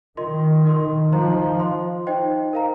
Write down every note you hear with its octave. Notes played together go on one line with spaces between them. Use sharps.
D#3 F4 A#4 D#5 C6
D#4 A#4 D#5 C6
F3 D#4 C5 D#5 A#5
C5 F5 C6
D#4 C5 D#5 G5
A#4 F5 A#5